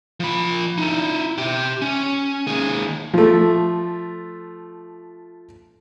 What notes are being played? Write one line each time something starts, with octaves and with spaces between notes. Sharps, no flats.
F3 B5
D#4 E4
G4 E5
C#4
D#2 G#4
F3 A3